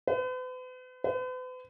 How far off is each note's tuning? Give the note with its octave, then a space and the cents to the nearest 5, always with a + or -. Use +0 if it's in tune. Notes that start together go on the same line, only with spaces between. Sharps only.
B4 +45
B4 +45